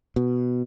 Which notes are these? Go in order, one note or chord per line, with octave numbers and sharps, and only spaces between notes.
B2